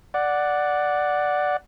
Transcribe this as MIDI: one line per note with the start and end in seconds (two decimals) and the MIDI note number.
0.14 1.57 74
0.14 1.57 78